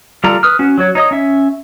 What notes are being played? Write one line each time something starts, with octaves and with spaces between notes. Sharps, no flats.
G3 F4 A4 D5 A#5
B4 D#6 F6
C#4 F#4
F#3 F#4 C#5
D#4 C#5 D#5 D#6
C#4 E5